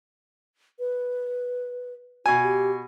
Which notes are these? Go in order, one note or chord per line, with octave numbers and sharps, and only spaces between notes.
B4
B2 F#4 G#5
G4